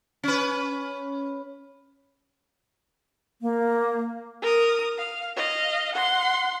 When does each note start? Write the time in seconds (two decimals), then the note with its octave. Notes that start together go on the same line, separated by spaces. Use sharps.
0.23 C#4 B4
3.42 A#3
4.42 A#4 D#6
4.98 F5
5.36 D#5 F5
5.93 F#5 C6